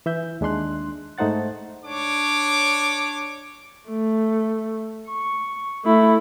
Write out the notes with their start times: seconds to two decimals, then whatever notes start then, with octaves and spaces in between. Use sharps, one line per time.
0.06 E3 E5 G6
0.41 D#2 G#3 D4 C6 F#6
1.18 G#2 A3 D#4 C5 F#5 A6
1.84 D4 C#5 D6
3.89 A3
5.08 C#6
5.85 A3 E4